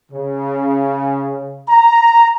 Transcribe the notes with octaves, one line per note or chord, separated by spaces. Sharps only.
C#3
A#5